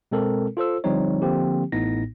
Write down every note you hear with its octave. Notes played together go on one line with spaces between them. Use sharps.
B2 G#3 C4 A4 A#4
F4 A4 C5 E6
D3 F3 G3 C4 D#4 C#5
D3 F3 A#3 C4 G4
A1 A2 B3 D#4 A#6